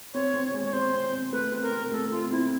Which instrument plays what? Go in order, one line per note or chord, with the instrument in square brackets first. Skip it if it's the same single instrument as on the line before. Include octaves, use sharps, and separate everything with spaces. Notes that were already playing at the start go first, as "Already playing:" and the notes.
[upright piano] C4 [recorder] C#5
[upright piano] C4
G#3
[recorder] C#5
[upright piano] C4 [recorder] C5
[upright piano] C4
C4
[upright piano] A3 [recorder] B4
[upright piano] C4
[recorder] A#4
[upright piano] C4
[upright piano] A3 [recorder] A4
[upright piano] C4 [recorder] F4
[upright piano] C4 [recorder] E4